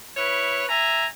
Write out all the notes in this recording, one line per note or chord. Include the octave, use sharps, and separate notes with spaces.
E4 B4 C#5
E5 G#5 A#5